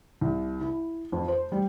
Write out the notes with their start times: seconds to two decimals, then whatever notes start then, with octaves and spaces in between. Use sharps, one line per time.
0.21 C2
0.61 E4
1.12 F2
1.28 C5
1.52 G3